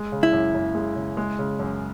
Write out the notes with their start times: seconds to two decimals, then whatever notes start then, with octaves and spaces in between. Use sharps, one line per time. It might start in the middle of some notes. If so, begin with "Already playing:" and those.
Already playing: G#3
0.12 C#3
0.23 E4
0.33 F#2
0.54 F#2
0.75 G#3
0.96 C#3
1.17 G#3
1.38 C#3
1.59 F#2